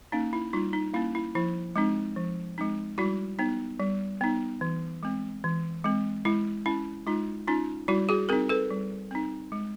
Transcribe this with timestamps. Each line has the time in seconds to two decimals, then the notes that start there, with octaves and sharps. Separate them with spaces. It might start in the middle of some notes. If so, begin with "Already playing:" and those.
0.12 A#3 C#4 D#4
0.33 E4
0.53 G3 D#4 F4
0.73 D#4
0.94 A#3 C#4 E4
1.15 E4
1.35 F3 E4
1.76 G#3 C4 D#4
2.16 F3
2.58 G#3 C4 D#4
2.98 G3 E4 F#4
3.39 B3 D#4
3.80 G3
4.21 B3 D#4
4.61 E3
5.03 G#3 C4
5.44 E3
5.84 G#3 C4
6.25 G#3 E4
6.66 C#4 E4
7.07 G#3 D#4 F4
7.48 C#4 D#4 F4
7.88 G3 E4 F#4
8.09 F#4 G#4
8.29 C4 D#4 G#4 A#4
8.49 A4 B4
8.71 G3
9.11 C4 D#4
9.52 G#3